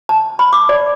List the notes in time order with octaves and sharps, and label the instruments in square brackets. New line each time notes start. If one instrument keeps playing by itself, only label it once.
[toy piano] A5
B5
D6
D5